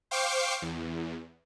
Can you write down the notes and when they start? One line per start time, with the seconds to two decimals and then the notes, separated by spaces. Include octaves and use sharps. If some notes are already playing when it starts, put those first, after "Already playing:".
0.11 C5 F5 G5 C#6 D6 C7
0.62 E2